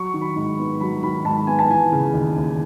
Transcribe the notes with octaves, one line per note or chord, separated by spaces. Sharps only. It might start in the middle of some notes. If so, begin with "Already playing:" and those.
Already playing: F#3 C#6
D#3
B5
G#2
B3
F#3 B5
D#3 B5
G#2 A5
B3 G#5
A5
E3 G#5
C#3
D#2
D#2